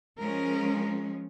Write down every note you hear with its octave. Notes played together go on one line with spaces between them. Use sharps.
F3 G#3 C#4 A#4